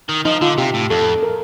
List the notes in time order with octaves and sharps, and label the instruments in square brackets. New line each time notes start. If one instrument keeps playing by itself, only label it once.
[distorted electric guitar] D#3
[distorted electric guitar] F3 [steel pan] D#4
[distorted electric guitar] D3 [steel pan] F4
[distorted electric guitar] C3 [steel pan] G4
[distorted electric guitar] A2
[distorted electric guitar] F2 [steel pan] A4
[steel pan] A#4